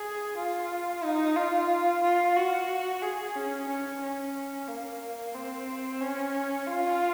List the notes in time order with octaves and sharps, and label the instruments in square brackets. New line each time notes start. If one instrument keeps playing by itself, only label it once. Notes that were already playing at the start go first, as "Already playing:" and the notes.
Already playing: [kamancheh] G#4
F4
D#4
F4
F4
F#4
G#4
C#4
C#4
C#4
A#3
C4
C#4
F4